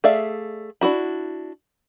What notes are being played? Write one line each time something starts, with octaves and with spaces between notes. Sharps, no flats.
A3 G#4 D5 E5 F5
D4 E4 F#4 B5